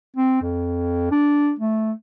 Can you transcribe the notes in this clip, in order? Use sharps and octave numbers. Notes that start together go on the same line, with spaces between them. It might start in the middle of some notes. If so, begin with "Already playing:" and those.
C4
F2
D4
A3